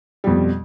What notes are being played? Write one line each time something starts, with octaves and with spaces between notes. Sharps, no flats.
F2 B2 G3